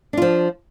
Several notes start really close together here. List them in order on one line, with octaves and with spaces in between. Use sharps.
D4 F4 F3